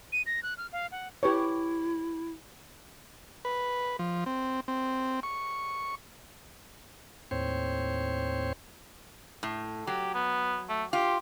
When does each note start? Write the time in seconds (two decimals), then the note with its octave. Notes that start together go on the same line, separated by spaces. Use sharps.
0.12 D#7
0.26 A#6
0.43 F#6
0.58 F6
0.72 F5
0.92 F#5
1.23 E4 G4 B4 C#5
3.45 B4
3.99 F3
4.26 C4
4.68 C4
5.23 C#6
7.31 D#2 A2 C4 C5 C#5
9.43 A2
9.87 F#3 G4
10.14 B3
10.69 A3
10.93 F4 G4